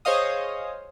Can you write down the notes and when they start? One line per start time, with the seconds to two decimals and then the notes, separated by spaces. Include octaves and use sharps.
0.05 G#4 C5 C#5 D#5 F5 D#6